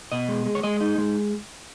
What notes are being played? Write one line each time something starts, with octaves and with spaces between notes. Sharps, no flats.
B2 D#5
G#3
G#3
C#5
G#3 D#5
D#4 D#5
G#3